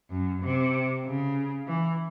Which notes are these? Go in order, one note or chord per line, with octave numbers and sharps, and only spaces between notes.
F#2
C3
C#3
E3